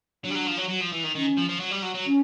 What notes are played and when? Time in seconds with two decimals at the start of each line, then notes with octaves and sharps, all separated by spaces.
0.24 F#3 D4
0.31 G3
0.35 F#3
0.47 F3
0.58 F#3
0.69 F#3
0.81 F3
0.92 E3
1.04 D#3
1.15 D#3 C#4
1.38 F3
1.49 F3
1.60 F#3
1.71 G3
1.83 F#3
1.95 F#3
2.06 C#4